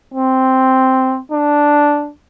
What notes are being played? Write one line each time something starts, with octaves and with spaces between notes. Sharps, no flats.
C4
D4